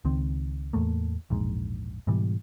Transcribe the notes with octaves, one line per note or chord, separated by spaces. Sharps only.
C#2 D#3 C4
E2 A2 A3 A#3
E1 A#1 G#2
G#2 B2 E3 G3